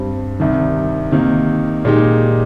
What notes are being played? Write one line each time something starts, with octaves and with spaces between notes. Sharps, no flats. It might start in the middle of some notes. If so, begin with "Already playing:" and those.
Already playing: G2 G3 C4
C2 C3 D#3
C3 D#3 A#3 D#4
A#2 G#3 D#4 G4